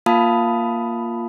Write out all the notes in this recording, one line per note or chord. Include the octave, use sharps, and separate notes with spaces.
A#3 F4 F5 A5 B5 D#6